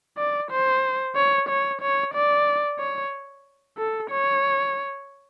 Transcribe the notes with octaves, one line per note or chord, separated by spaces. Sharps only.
D5
C5
C#5
C#5
C#5
D5
C#5
A4
C#5